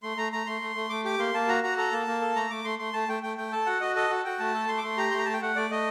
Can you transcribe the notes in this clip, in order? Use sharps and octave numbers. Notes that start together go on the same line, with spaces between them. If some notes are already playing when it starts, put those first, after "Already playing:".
A3 C6
A3 A#5
A3 A#5
A3 C6
A3
A3
A3 D6
G4 D6
A#3 C6
A#3 A5
F#4 A#5
F#4 A#5
A4 A#5
A#3 A5
A#3
A4
A3 A#5
A3 D6
A3 C6
A3 C6
A3 A5
A3 G5
A3 G5
A3 G5
A4 A5
F#4 F#5
F#4 D#5
A4 D#5
F#4
F#4 G5
A3 A5
A4
A3 C6
D6
A3 C6
G4 A#5
A3 C6
A#5
A3 A5
G5
A3 F#5
A3 D5
A3 D#5